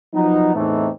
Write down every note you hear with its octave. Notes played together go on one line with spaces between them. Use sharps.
F3 F#3 B3 D#4
E2 A2 E3 A3 C4 D#4